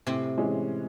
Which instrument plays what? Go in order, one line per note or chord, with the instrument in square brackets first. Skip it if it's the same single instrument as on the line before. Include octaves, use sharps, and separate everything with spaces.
[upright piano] A2 [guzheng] C3 C4
[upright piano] E3 G#3 C#4